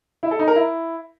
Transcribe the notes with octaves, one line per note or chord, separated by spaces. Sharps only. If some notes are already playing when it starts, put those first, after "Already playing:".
E4
A4
D#4
A#4
E4